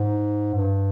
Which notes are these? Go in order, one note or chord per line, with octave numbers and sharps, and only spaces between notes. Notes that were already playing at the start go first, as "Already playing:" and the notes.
Already playing: G#2
G2